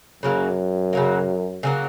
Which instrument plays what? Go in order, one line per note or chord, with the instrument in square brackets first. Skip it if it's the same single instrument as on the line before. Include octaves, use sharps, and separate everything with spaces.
[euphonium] F#2 [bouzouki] C#3 F#3 A#3
[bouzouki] C#3 F#3 A#3
C#3 F#3 A#3